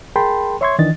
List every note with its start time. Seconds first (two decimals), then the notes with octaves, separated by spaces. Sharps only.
0.16 G#4 A#4 G5 A5 B5 C6
0.61 C#5 E5 C6 C#6 G#6
0.79 D#3 E3 D4 D#5 A6